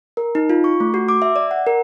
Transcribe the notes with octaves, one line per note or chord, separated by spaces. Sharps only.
A#4
D#4
F4
C#6
A3
F#4
D6
E5
D5
F#5
A#4